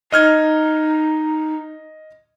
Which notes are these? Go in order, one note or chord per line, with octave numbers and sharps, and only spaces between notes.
D#4 D#5 F6 G#6